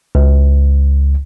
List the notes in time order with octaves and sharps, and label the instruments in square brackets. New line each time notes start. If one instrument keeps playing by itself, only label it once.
[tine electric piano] C#2